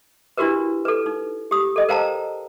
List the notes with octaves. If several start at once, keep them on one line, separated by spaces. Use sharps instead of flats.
D4 E4 F#4 G4 A#4 B4
A4 B4
D#4
G4 D#6
A4 D#5
A#4 C5 F5 G5 A5 A#5